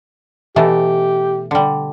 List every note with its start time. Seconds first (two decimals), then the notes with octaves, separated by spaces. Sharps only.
0.56 B2 E3 A3 G4
1.51 D3 G3